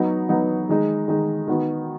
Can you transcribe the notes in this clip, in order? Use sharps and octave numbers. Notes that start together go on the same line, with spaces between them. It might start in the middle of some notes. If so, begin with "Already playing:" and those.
Already playing: F#3 B3 D#4 F#4
F#3 B3 D#4 F#4
D#3 G#3 D#4
D#3 G#3 D#4
D#3 B3 F#4